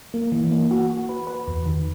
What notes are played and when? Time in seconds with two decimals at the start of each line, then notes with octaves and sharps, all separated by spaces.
0.14 A#3
0.32 E3
0.51 A#3
0.71 F#4
0.90 F#4
1.09 B4
1.27 B4
1.47 E2
1.66 D#3